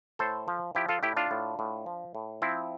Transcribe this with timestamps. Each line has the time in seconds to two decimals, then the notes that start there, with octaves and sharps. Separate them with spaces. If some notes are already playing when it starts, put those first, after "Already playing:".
0.19 A2 A4 C5
0.48 F3
0.75 F3 E4 G4
0.89 F4 A4
1.03 A2 E4 G4
1.17 D4 F4
1.31 A2
1.59 A2
1.86 F3
2.15 A2
2.42 F3 C4 E4